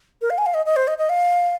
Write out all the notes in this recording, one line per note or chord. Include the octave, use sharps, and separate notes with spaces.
A#4
F5
G#5
F5
D#5
D#5
C5
D#5
D#5
F5